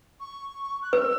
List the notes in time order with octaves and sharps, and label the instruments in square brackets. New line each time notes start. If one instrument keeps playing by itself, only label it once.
[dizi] C#6
F#6
[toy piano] B4 [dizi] E6